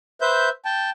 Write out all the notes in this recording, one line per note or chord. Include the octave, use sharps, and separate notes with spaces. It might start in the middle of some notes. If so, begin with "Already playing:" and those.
B4 C5 E5 G6
G5 A5